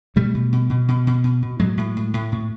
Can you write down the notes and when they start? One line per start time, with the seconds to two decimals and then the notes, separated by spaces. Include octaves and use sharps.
0.16 B2 G3 A3
0.35 B2
0.52 B2
0.70 B2
0.88 B2
1.07 B2
1.24 B2
1.42 B2
1.59 A2 F#3 G#3
1.77 A2
1.97 A2
2.14 A2
2.32 A2